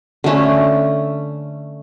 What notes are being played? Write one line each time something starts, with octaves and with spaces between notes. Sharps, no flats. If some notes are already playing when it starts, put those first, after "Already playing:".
D3 A3 C#4